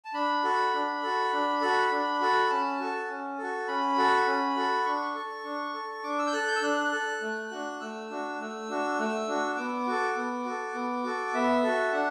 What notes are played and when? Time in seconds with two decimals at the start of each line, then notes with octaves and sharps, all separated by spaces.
0.05 A5
0.14 D4 B5
0.44 F#4 A4
0.73 D4
1.03 F#4 A4
1.33 D4
1.61 F#4 A4
1.91 D4
2.21 F#4 A4
2.50 C#4 A5
2.80 F#4 A4
3.09 C#4
3.38 F#4 A4
3.68 C#4 B5
3.97 F#4 A4
4.27 C#4
4.56 F#4 A4
4.85 D4 C#6
5.15 A4
5.44 D4
5.74 A4
6.03 D4 D6
6.19 E6
6.27 G6
6.33 A4 F#6
6.48 G6
6.56 E6
6.62 D4 F#6
6.92 A4
7.21 A3
7.51 D4 F#4
7.80 A3 E6
8.10 D4 F#4
8.39 A3
8.69 D4 F#4
8.99 A3
9.28 D4 F#4
9.57 B3 D6
9.87 F#4 A4
10.16 B3
10.45 F#4 A4
10.75 B3
11.04 F#4 A4
11.34 B3 E5
11.63 F#4 A4
11.92 D4 F#5